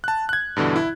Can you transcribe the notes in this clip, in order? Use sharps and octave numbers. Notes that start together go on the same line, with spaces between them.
A5 F#6
F#6 G#6
G2 B2 D3 E3
E4